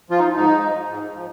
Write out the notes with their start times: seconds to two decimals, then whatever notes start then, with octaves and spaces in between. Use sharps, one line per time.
0.10 F3 F4
0.19 D#4
0.36 G#2 D#4
0.63 F3
0.89 G#2
1.16 F3